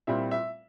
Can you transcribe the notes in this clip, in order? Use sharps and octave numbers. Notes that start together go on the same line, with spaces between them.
A#2 G3 C4 E4 E5
E5